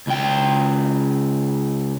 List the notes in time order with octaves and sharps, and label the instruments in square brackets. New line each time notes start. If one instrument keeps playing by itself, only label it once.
[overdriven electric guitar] C#2 G5